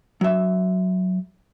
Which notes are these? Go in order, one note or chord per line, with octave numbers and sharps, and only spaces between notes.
F#3 E5